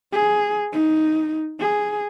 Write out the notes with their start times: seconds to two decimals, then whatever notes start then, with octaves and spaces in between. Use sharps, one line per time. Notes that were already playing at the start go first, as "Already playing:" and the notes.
0.12 G#4
0.73 D#4
1.60 G#4